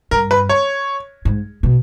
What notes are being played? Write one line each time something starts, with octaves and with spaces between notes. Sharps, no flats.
G2 A#4
B4
C#5
G#2
B2